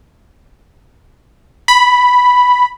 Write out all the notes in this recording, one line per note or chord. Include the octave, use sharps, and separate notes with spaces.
B5